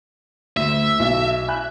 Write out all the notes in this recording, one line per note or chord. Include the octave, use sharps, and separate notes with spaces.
D2 E5
B1
G#5 B5 F#6